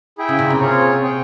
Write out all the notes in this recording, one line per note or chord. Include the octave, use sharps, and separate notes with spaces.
E4 G#4 E5 G5
C#3
A#2
C3
C4 F4 G#4 C#5
G#4 C#5 G5